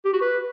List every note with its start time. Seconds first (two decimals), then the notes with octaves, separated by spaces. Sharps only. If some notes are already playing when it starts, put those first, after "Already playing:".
0.05 G4
0.13 F#4
0.21 B4